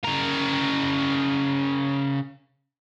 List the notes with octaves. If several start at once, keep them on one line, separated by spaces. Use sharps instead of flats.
C#3 A#4